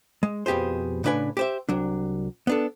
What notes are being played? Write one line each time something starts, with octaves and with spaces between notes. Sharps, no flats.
G#3
F2 B2 G4 G#4 C5
A2 C#3 D4 B4 G#5
G4 C5 E5
C2 F#3 D4
B3 D4 A4